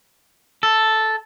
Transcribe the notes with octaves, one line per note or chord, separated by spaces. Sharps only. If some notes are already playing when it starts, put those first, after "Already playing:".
A4